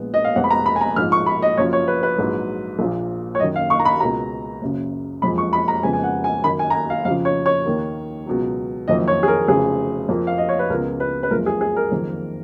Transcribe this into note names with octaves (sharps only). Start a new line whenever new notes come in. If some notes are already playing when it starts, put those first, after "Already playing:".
Already playing: A#1 A#2 G#3 B3
D#5
F5
F1 F2 F3 G#3 B3 F#5
B5
A#5
B5
G#5
A#5
A#1 G#2 F3 F6
C#6
B5
D#5
F#1 F#2 F3 C#5
C#5
B4
B4
A#1 G#2 F#3
A#1 A#2 F3
C#5
F#1 F#2 D#3 D#5
F5
C#6
A#5
B5
C#2 B2 A#3 A#5
F#1 F#2 C#3
F#1 F2 F3 G#3 B5
C#6
B5
A#5
F2 C#3 G#3 B3 G#5
G#5
F#5
G#5
F#2 D#3 A#3 B5
G#5
A#5
G#5
F5
F2 C#3 F3 F5
C#5
C#5
D#2 D#3 A#3
C#2 B2 F#3
F#1 F2 D#3 F#3 D#5
C#5
G#4
A#4
F1 F2 C#3 F#3 B3 G#4
F2 F3 A#3
F5
D#5
C#5
B4
C#2 C#3 F3 B3 A#4
B4
B4
F#1 F2 F3 G#3 A#4
G#4
G#4
A#4
F#1 F2 D#3 A#3